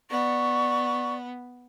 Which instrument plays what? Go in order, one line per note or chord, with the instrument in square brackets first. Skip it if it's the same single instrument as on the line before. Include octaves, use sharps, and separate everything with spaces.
[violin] B3 [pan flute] D5 [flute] C#6